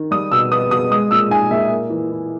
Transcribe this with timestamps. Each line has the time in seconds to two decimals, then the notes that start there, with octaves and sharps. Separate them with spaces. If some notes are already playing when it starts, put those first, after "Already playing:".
Already playing: D#3
0.11 G3 D#6
0.32 B2 E6
0.52 B3 D#6
0.71 B2 D#6
0.90 G#3 D#6
1.11 A#2 E6
1.30 D#4 G#5
1.51 A#2 E5
1.71 A#3
1.90 E3
2.11 E4